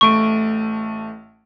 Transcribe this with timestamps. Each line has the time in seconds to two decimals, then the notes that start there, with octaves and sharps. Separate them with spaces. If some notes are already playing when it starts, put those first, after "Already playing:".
0.01 A1 A3 C#6 D7